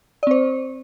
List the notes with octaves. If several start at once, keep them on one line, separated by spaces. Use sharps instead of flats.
C4 C5 D5